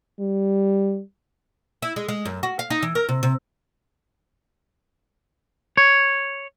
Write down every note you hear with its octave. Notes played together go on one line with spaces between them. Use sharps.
G3
E4
G#3
G#3
F#2
F#4
F5
D#4
E3
A#4
C3
C3
C#5